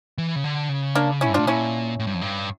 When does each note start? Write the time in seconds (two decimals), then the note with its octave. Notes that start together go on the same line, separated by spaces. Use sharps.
0.18 E3
0.36 C#3
0.44 D3
0.69 C#3
0.95 A#3 D4
1.21 C#4 E4
1.29 G2
1.34 A2 D4 F4
1.47 A#2 C#4 E4
2.00 A2
2.07 G2
2.14 F2
2.22 G2